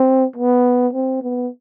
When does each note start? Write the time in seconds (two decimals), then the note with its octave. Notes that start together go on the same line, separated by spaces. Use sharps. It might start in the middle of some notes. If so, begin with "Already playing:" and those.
Already playing: C4
0.36 B3
0.93 C4
1.22 B3